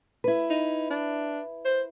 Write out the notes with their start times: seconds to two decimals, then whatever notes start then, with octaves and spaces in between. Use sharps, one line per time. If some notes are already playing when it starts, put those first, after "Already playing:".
0.24 E4 B4
0.50 D#4
0.91 D4
1.65 C5